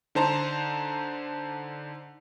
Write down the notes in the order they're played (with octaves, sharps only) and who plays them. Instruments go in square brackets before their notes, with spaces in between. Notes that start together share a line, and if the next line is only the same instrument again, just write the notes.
[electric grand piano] D3 D#4 C5 A5 A#5 C6